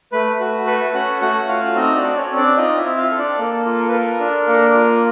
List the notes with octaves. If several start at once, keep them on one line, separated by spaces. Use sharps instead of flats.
A3 B4 B5
F#4
A4 B4 B5
C#4 F#4 F#5
A3 F#4 F#5
F4 F#4 F5
C4 D#4 D#5
D4 D5
A4
C#4 C#5
C4
D4 D5
D#4 F4 D#5
E4 E5
C4
F4 F5
A4
D4 D5
A#3 A4
F4
A#4
B4
A4 A#4
D4
A#3
F4